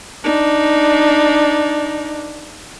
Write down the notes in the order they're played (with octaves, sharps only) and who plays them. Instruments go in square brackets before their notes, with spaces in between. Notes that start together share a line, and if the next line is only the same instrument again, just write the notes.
[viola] D4 D#4